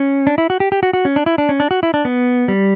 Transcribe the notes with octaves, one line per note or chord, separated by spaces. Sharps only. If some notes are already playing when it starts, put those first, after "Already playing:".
Already playing: C#4
D4
E4
F#4
G4
G4
F#4
F#4
C#4
D4
E4
D4
C#4
D4
F#4
E4
D4
B3
G3